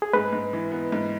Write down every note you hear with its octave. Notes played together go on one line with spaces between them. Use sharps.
G#4
G#2 B4
G#2
E3
B3
G#2